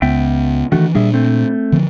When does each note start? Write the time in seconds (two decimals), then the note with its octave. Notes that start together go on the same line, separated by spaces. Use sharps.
0.02 C#2 B3 E5 G5
0.72 D#3 E3 A3 D4 F#4
0.95 A#2 G3 D4 G#4 E5
1.14 A3 C4
1.72 D3 F3